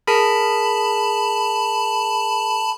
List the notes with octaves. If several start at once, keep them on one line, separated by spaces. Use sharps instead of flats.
G#4 A#4 A5 B5 B6